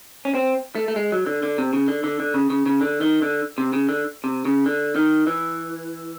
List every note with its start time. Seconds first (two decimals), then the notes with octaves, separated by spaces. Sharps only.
0.25 C#4
0.35 C4
0.75 A3
0.88 A3
0.96 G#3
1.12 F#3
1.27 D3
1.43 D3
1.58 C3
1.73 C#3
1.88 D3
2.04 D3
2.20 D3
2.34 C#3
2.50 C#3
2.66 C#3
2.81 D3
3.01 D#3
3.22 D3
3.58 C3
3.73 C#3
3.89 D3
4.24 C3
4.45 C#3
4.66 D3
4.96 D#3
5.27 E3